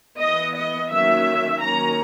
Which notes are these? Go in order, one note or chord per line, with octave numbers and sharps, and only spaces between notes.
E3 B3 D#5
D#5
D#3 F#3 A#3 C#4 E5
D#3 F#3 A#3 C#4 A#5